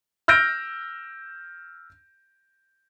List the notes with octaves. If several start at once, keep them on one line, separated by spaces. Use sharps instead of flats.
E6 F6 G6 A#6 D7